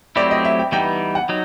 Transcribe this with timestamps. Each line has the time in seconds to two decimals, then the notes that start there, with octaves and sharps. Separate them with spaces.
0.16 F#3 A3 C4 E4 G4 D5
0.31 D#5
0.45 E5
0.59 G5
0.72 E3 G3 B3 D#4 G5
1.15 F#5
1.29 F#3 D#4